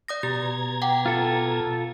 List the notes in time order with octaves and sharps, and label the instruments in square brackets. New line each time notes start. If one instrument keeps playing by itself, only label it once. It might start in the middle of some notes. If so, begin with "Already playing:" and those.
[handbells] D5 D#6 A#6
[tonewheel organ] B2 A#5 G#6 [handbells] G4
[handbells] F#5 G5 D6
[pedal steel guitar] F4 A4